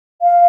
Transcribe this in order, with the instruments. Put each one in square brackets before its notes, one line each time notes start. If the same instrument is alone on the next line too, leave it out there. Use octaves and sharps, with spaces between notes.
[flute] F5